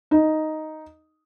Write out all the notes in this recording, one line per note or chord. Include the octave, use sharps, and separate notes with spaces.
D#4